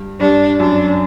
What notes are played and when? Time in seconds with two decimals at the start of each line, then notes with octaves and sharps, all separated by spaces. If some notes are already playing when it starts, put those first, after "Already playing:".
Already playing: G2
0.21 G2 D4
0.60 F#2 D4